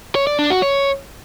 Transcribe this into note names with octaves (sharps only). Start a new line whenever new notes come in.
C#5
D5
D4
F#4
C#5